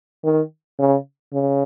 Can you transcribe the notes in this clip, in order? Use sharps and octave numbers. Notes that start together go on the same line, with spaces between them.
D#3
C#3
C#3